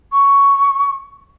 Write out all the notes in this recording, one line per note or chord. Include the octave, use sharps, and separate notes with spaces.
C#6